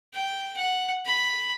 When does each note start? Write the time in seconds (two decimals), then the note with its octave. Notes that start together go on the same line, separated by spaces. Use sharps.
0.13 G5
0.57 F#5
1.06 B5